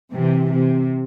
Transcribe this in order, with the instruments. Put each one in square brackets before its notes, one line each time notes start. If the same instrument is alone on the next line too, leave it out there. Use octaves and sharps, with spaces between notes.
[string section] C3 E3
C3